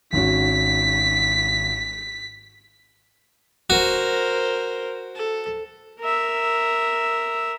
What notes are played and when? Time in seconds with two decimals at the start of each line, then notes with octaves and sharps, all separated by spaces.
0.13 G#1 C#4 F#4 B6
3.70 F#4 A#4 C5
5.15 A4
6.00 A#4 E5